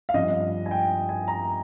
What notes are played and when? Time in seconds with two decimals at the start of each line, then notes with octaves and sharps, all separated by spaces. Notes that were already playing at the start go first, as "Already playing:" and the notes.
0.09 F5
0.14 G2 F3 C4 D#5
0.66 G#5
0.71 G5
1.09 G#5
1.28 A#5